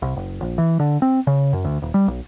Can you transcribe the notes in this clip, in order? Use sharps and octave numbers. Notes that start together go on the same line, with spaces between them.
C2
F#1
A#1
E3
D3
C4
C#3
F#2
D2
D#1
G3
B1